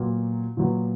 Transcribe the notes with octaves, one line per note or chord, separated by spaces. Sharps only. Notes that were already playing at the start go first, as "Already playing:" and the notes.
Already playing: A#2 F#3 B3
A#2 F#3 B3